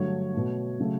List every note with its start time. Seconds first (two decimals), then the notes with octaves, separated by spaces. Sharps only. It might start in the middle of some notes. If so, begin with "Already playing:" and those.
Already playing: G2 D3 F#3 A3 C#5
0.34 B2 A3
0.79 C#3 F#3 A3